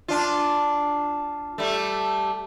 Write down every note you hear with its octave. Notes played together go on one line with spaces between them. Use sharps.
D4 F4
G3 A3